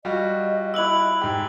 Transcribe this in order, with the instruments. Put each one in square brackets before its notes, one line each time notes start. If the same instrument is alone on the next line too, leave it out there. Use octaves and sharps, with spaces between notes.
[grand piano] G3 F4 F#4 [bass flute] D#5
[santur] E4 D6 [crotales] E6 F#6 F#7
[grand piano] G#2 G4 [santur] G5